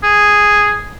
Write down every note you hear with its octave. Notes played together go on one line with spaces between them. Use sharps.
G#4